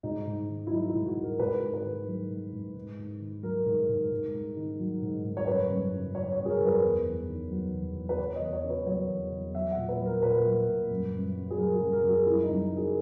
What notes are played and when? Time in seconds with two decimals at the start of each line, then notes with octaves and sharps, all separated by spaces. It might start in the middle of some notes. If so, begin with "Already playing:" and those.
0.03 G#2 D#4
0.27 G#2
0.49 D#3
0.67 E4
0.71 F#3 D#4
0.89 E4
0.95 G#2
1.05 F#4
1.16 G#2
1.22 A#4
1.39 G#2 B4
1.62 G#2
1.74 B4
1.84 D#3
2.07 F#3
2.30 G#2
2.53 G#2
2.76 G#2
2.98 G#2
3.20 D#3
3.43 F#3 A#4
3.66 G#2
3.88 G#2
4.11 G#2
4.34 G#2
4.56 D#3
4.79 F#3
5.02 G#2
5.24 G#2
5.37 C#5
5.46 F#2 B4
5.70 F#2
5.93 C#3
6.14 F#3 C#5
6.32 C#5
6.37 F#2
6.45 G#4
6.49 A#4
6.60 F#2
6.66 B4
6.83 E2
7.05 E2
7.28 D#3
7.51 F#3
7.73 E2
7.96 E2
8.09 B4
8.19 E2 C#5
8.35 D#5
8.41 E2
8.53 C#5
8.64 C#3
8.70 B4
8.86 F#3 C#5
9.09 E2
9.32 E2
9.54 F#3 E5
9.71 F#5
9.77 A#2
9.89 B4
10.00 F#3
10.06 A#4
10.22 A#2 B4
10.45 F#3
10.67 A#2
10.90 F#2
11.13 F#2
11.35 C#3
11.50 G#4
11.58 F#3 A#4
11.75 G#4
11.81 F#2
11.92 A#4
12.03 F#2
12.09 G#4
12.26 F#2 E4
12.43 D#4
12.49 F#2
12.69 C#3 A#4
12.77 G#4